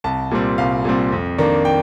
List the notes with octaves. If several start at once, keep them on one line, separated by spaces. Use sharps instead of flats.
C2 A5
A#2 G3 C4
C2 F5
A#2 G3 C4
F2
D#3 A#3 D4
G5